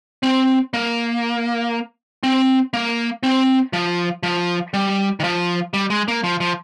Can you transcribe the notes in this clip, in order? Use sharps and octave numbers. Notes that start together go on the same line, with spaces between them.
C4
A#3
C4
A#3
C4
F3
F3
G3
D#3
F3
G3
G#3
A#3
F3
F3